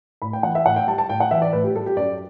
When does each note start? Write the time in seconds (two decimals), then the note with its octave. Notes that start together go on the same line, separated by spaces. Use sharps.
0.22 A2 B5
0.33 G5
0.43 E3 F#5
0.55 E5
0.66 A2 F#5
0.76 G5
0.87 G3 A5
0.98 A5
1.09 A2 G5
1.20 F#5
1.31 E3 E5
1.42 D5
1.53 A2 B4
1.64 G4
1.76 G3 A4
1.86 G4
1.97 F#2 D5